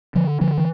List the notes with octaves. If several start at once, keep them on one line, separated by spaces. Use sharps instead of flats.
D3 F3
D3 F3
E3